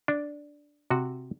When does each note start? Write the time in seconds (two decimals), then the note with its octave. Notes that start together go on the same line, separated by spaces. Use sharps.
0.08 D4
0.90 C3 F#4